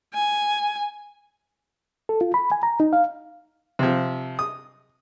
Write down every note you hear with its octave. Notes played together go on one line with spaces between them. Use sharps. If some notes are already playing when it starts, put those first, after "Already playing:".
G#5
A4
F4
B5
G#5
A#5
D#4
F5
C3 F3
D#6